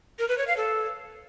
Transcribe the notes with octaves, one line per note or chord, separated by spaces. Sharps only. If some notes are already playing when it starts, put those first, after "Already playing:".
A#4
B4
C#5
F5
A4